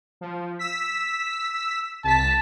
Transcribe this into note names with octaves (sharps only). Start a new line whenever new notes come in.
F3
E6 B6
C2 A5 B6